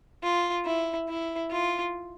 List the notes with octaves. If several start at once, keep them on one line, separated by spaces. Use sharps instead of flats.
F4
E4
E4
F4